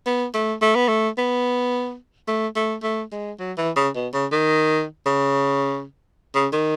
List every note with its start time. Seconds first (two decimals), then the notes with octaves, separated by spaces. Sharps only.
0.06 B3
0.34 A3
0.62 A3
0.75 B3
0.88 A3
1.18 B3
2.28 A3
2.56 A3
2.83 A3
3.12 G#3
3.39 F#3
3.57 E3
3.76 C#3
3.95 B2
4.13 C#3
4.32 D#3
5.06 C#3
6.35 C#3
6.52 D#3